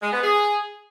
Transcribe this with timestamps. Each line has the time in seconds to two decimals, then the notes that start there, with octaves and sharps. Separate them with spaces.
0.02 G#3
0.13 B3
0.23 G#4